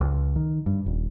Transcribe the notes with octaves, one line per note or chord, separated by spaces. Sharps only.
C#2
D#3
G2
D#1